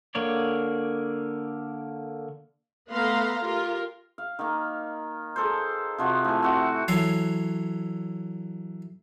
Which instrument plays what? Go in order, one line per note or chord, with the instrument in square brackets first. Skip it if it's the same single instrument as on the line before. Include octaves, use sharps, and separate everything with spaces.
[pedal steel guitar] D3 A#3 C#5 D5
[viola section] A3 B3 B4 F5 A#5 C6
F4 G4 A#4
[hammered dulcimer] F5
D#3 A#3
G#4 A4 C5
C3 F3 F#4
A2 G#5
C4 F#4
[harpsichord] E3 F#3 A4 C#5 C6